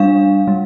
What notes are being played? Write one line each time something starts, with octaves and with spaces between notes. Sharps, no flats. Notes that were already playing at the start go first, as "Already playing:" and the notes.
Already playing: G3 D4 F5
G3